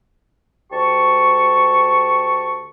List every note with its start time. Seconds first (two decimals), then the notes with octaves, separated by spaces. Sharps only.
0.71 D2 G4 A5 C#6